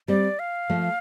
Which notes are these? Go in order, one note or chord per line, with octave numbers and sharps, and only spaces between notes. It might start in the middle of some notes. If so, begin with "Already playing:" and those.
G3 C4 D5
F5
F3 A3